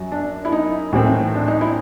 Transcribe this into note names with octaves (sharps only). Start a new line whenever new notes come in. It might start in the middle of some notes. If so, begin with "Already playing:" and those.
Already playing: F#2 F#3
D4
E4
D#4
A2 E3 A3 C4
D4
D#4
E4